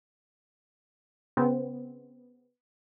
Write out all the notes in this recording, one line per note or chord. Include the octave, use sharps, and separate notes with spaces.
C#3 B3 C4